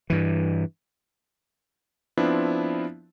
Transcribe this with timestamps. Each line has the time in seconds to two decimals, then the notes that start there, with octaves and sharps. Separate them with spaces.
0.10 G2 E3
2.17 F3 B3 C4 D4 E4